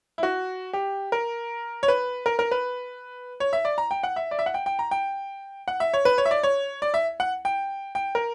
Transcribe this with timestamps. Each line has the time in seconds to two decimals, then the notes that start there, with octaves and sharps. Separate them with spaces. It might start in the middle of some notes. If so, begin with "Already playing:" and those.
0.18 E4
0.23 F#4
0.73 G4
1.12 A#4
1.83 C#5
1.88 B4
2.26 A#4
2.39 A#4
2.51 B4
3.40 C#5
3.53 E5
3.65 D5
3.78 A#5
3.91 G5
4.03 F#5
4.16 E5
4.31 D5
4.39 E5
4.46 F#5
4.54 G5
4.66 G5
4.79 A#5
4.91 G5
5.68 F#5
5.80 E5
5.93 C#5
6.05 B4
6.18 C#5
6.26 E5
6.31 D5
6.43 C#5
6.82 D5
6.94 E5
7.20 F#5
7.45 G5
7.95 G5
8.15 A#4